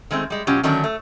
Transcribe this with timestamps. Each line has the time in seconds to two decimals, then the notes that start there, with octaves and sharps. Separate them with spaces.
0.11 D#3 G#3 A3 C4
0.30 G3 G#3
0.47 B2 F#3 C#4 F4 G4
0.63 D3 D#3 F#3 A3 C#4 D4
0.84 A3